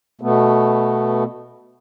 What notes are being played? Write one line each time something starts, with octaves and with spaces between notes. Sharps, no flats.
B2 A3 B3